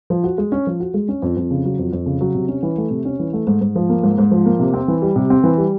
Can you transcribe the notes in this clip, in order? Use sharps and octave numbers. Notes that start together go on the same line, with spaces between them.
F3
F#4
G#3
C#4
F3
F#4
G#3
C#4
F2
F2
C#3
F#3
F2
F2
C#3
F#3
C3
C#4
E3
A3
C3
C#4
E3
A3
G#2
G#2
F3
A#3
G#2
G#2
F3
A#3
C3
C4
E3
G3
C3
C4
E3
G3